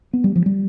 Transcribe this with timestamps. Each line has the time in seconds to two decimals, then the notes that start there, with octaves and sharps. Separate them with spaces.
0.13 B3
0.24 G3
0.36 F3
0.46 G3